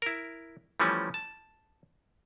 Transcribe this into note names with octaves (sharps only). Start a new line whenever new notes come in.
E4 A#4
E3 F3 G3 A3 C#4
A5